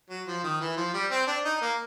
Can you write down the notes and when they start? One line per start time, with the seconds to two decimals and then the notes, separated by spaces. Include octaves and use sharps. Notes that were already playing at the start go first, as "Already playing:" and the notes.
0.10 F#3
0.27 F3
0.43 D#3
0.60 E3
0.77 F3
0.94 G3
1.11 C4
1.27 D4
1.45 D#4
1.61 A#3